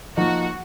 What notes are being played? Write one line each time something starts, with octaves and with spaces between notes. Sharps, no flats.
F3 A#3 D#4 F#4